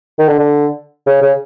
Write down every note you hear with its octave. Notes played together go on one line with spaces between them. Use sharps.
D#3
D3
D3
C#3
C#3